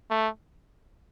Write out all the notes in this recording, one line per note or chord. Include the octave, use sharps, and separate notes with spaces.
A3